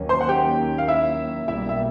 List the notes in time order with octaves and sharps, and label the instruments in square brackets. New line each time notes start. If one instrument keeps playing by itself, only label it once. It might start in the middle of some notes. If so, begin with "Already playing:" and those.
Already playing: [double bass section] D#2 D#3 F#3 A#3 C#4
[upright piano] C5 C6
F#5
G4 G5
F5
E4 E5
[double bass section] B1 B2 G3 A#3 [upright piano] E4 E5
[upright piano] E5